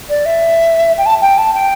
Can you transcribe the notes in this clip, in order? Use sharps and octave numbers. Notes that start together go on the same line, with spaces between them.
D5
E5
G5
A5
G5
A5
G5